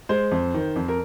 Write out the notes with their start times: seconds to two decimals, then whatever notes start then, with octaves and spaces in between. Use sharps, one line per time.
0.09 G#3 C5
0.31 F2
0.54 D#3
0.76 F2
0.88 A#4